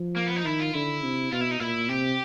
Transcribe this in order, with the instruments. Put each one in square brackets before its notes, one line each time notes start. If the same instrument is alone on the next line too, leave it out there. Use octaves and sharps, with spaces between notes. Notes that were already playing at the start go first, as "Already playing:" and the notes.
Already playing: [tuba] F3
[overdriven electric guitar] A#3
B3
D#4
[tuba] D#3 [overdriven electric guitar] E4
[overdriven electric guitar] F4
[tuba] D3 [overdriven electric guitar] E4
[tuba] C3
[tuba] B2 [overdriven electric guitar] F4
[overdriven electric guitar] E4
D#4
[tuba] A#2 [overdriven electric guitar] E4
[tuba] C3 [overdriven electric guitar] G4